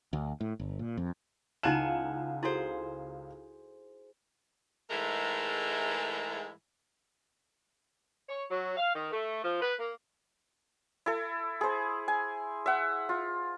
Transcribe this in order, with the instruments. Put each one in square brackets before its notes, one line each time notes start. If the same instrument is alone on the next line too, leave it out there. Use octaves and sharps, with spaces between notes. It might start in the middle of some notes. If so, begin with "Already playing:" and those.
[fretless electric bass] D2
A2
G1
A#2
F2
[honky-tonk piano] C#2 E7 [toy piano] D#4 E4 A5 [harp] F5 F#5 G#5
[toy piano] E4 F#4 A4 [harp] G#4 C5
[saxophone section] G#2 E3 G#3 A3 A#4
C#5
F#3
F5
D#3
A3
F3
B4
A#3
[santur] E4 A4
G#4 C5
G#5
E5 F#5
F4